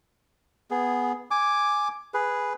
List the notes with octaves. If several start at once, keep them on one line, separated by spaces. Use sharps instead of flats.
B3 G#4
G#5 D6
G#4 B4